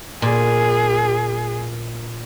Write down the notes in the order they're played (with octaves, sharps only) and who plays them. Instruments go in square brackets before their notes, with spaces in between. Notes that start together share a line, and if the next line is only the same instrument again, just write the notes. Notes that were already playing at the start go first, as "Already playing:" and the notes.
[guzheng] A#2 [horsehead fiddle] G#4